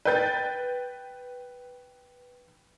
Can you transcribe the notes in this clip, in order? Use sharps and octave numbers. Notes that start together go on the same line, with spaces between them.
B4 G5 G6 A6